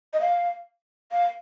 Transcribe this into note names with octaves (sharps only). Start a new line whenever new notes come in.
D#5
F5
F5